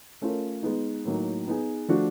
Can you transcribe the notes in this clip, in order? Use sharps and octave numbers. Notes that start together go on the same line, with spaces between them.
A3 C#4 F4 A#4
G#3 B3 D#4
A2 F#3 A#3 D#4
B3 D#4 G#4
F3 A3 D4 F#4